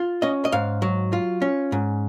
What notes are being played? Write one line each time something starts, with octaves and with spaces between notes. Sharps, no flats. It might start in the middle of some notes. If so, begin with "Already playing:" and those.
Already playing: F4
C#4 D#5
D#5
G#2 F5
F#3
F4
C#4
G#2